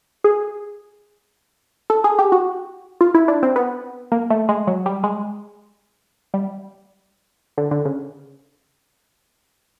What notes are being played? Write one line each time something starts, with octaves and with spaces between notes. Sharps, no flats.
G#4
A4
G#4
G4
F#4
F4
E4
D4
C4
B3
A#3
A3
G#3
F#3
G3
G#3
G3
D3
D3
C#3